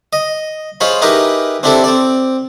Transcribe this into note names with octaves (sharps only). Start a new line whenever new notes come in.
D#5
G#3 F4 C5 C#5 B5
D#4 E4 G4 G#4 A#4 B4
C4 D4 E4 G4 A4 C5
C4 D5